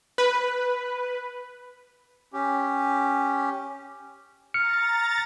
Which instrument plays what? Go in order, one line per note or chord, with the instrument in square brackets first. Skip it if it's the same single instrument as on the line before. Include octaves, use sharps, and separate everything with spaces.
[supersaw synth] B4
[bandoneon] C#4 G4
[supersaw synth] A#5 A6 [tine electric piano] F6 C#7